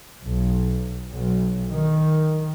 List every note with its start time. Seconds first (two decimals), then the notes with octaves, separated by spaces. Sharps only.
0.22 B1
1.12 B1
1.72 D#3